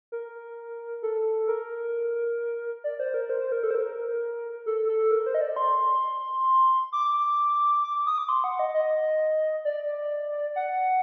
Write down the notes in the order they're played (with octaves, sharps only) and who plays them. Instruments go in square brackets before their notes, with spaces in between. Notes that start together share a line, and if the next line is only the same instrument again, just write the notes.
[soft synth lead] A#4
A4
A#4
D5
C5
A#4
C5
C5
A#4
A4
C5
A#4
A4
A4
A#4
C5
D#5
D5
C6
D6
D6
D#6
D6
C6
F#5
D#5
D#5
D5
F#5